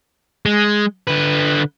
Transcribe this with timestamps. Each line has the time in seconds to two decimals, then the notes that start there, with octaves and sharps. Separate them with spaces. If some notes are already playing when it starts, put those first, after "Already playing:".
0.46 G#3
1.08 D3 B4